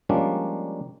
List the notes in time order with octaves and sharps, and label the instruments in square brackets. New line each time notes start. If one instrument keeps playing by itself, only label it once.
[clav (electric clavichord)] F3 G3 G#3 A#3 C#4 D4